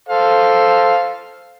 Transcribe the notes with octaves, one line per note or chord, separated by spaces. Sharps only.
A4 C5 F5